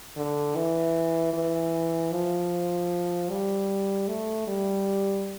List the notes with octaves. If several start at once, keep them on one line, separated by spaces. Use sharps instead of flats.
D3
E3
E3
F3
G3
A3
G3